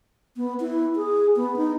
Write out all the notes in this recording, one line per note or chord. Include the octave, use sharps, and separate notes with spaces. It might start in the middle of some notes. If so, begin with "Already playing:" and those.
B3
E4
G#4
B3
D#4